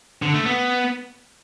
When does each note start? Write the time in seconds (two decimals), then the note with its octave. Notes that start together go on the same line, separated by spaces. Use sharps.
0.22 D3
0.34 A3
0.46 B3